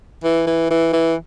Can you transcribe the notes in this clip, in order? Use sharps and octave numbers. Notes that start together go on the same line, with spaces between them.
E3
E3
E3
E3